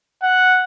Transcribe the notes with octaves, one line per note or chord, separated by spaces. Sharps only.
F#5